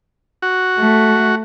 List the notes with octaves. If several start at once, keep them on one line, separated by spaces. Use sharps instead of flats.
F#4
A3